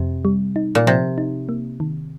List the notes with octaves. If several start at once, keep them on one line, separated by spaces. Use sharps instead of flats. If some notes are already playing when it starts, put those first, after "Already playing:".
Already playing: F2 C3
G3
D#4
A#2
C3 F3
D#4
A#3
D#3